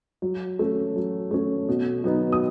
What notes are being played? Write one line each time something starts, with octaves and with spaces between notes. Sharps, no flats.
F#3
A3 C#4
F#3
A3 C#4
B2
F#3 B3 D#4
D#6